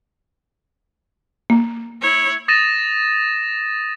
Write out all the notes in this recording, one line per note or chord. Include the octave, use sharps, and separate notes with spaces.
A#3
E4 C#5
D#6 A6 A#6 D#7 E7